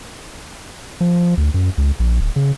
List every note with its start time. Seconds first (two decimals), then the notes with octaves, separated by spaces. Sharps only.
1.01 F3
1.37 D2
1.54 F#2
1.78 C#2
1.99 A#1
2.21 D1
2.36 C#3